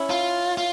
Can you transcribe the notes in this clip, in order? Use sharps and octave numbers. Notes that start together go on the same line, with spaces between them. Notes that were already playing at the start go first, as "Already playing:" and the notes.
Already playing: C#4 E4
F4
F4